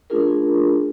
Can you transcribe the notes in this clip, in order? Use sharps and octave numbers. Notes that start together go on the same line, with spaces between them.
A3 C#4 D4 F4 G#4 A#4